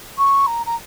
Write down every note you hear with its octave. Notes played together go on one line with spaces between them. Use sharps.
C#6
A#5
A#5